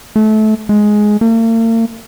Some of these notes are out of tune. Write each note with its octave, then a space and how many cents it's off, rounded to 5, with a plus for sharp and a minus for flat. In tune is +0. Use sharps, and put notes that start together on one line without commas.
A3 -25
G#3 +10
A#3 -45